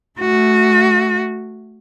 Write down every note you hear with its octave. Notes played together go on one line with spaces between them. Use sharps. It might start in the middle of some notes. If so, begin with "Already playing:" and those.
A3 F#4